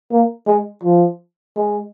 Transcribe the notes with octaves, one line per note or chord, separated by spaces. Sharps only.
A#3
G#3
F3
G#3